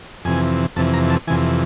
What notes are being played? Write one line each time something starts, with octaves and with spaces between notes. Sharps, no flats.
F2 C3 E3 G#5
F2 C3 E3 A5
A#5
A5
F2 C3 E3 G#5